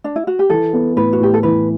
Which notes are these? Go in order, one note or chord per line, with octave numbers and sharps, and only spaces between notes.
D4
E4
F#4
G4
E3 A4
B3
A2 B4
F#4
A2 G4
A4
E3 B4